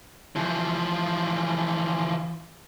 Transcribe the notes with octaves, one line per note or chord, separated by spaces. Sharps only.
E3 F3